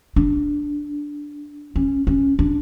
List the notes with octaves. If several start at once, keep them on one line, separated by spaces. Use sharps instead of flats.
D4
C#4
C#4
D4